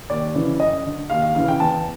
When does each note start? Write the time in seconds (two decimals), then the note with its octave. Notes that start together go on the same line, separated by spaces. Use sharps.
0.10 D#2 D5
0.34 C#3 E3
0.60 F#2 D#5
0.85 D3
1.10 D#2 F5
1.22 F5
1.35 C#3 E3 F5
1.48 G5
1.60 E2 A5